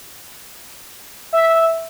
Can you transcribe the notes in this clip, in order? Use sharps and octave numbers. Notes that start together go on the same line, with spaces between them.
E5